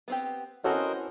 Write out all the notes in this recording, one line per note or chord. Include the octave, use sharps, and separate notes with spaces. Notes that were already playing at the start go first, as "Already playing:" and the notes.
B3 C4 G4
E3 C4 C#4 F#4 A4 A#4 C5 D#5